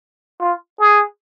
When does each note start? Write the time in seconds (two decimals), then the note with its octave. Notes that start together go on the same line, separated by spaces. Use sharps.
0.41 F4
0.80 G#4